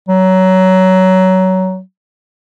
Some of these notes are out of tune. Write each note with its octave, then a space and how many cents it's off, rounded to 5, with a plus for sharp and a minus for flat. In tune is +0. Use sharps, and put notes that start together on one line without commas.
F#3 +20